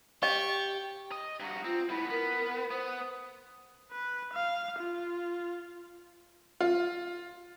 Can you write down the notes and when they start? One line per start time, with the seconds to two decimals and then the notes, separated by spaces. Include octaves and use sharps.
0.23 G4 D#5 C#6
1.12 D#5
1.40 G2 F#4 A#5
1.65 C4 F4
1.90 A2 B3 E4 B5
2.10 B3 A#4
2.71 B3 C5 D#6
3.91 B4
4.33 F5
4.79 F4
6.61 F4